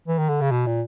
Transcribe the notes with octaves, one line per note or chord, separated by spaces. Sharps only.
E3
D#3
D3
C#3
B2
A#2